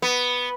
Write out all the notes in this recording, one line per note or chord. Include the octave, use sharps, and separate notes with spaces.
B3